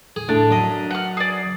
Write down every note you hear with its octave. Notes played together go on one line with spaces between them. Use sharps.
G#4
A2 D4
F#2 D#5
F#5 F6
G#4 D5